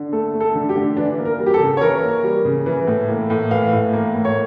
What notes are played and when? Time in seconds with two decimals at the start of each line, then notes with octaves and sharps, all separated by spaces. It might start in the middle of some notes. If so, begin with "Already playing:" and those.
Already playing: D3
0.12 A3 A4
0.34 A3
0.40 A4
0.55 D3
0.69 G4
0.76 D3
0.97 E3 D4
1.18 A#3
1.25 A#4
1.39 G3
1.46 G4
1.54 A4
1.60 C#3
1.77 C#5
1.81 E3 A#4
2.03 A#3
2.24 G3
2.45 C#3
2.66 E3
2.87 A2
3.09 A#3
3.30 A2
3.51 E3 F5
3.72 A2
3.93 A#3
4.14 A2
4.25 C#5